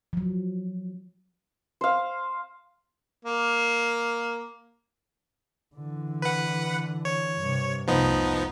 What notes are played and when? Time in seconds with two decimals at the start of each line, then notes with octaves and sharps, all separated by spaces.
0.13 F3 F#3
1.81 C5 F5
3.25 A#3
5.76 D3 E3
6.22 B4 F#5
7.05 C#5
7.38 G2 C3
7.87 F1 C2 F3 B3 D#4